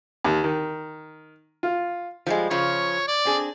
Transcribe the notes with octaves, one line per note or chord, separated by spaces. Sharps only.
D#2
D#3
F4
F3 G3 G#3
C#3 F3 F4 C#5
D5
C4 D4 G#4